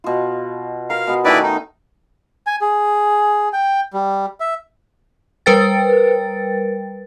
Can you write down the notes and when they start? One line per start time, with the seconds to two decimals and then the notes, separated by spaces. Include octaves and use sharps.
0.04 B2 F4
0.90 A#4 F5
1.07 B2 B3
1.25 D#3 A3 C#4 E4 B4 D5
1.43 D#4
2.47 G#5
2.61 G#4
3.53 G5
3.93 G3
4.40 E5
5.46 G3 A#4 B4 G5 A6